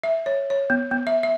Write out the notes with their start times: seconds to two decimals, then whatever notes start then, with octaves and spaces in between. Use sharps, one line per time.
0.04 E5
0.26 C#5
0.50 C#5
0.70 B3
0.91 B3
1.07 E5
1.23 E5